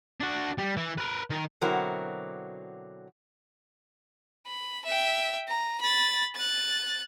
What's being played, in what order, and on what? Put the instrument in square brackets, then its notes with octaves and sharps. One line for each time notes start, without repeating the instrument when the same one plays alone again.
[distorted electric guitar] D4 F#4
G3
E3
A#4 B4
D#3 A#4
[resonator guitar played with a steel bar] B2 D3 F#3 C4 E4 A#4
[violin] B5
E5 G5
A#5
B5 A6
F#6 A6